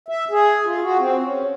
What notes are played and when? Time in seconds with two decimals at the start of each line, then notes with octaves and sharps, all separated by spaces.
0.08 E5
0.31 G#4
0.66 F4
0.82 F#4
0.99 C4
1.23 C#4